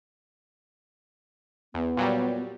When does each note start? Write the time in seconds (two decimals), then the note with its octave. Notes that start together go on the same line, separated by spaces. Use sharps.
1.74 E2 B3
1.97 A#2 F#3 G3